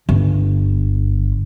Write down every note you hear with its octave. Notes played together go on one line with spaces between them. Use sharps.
G1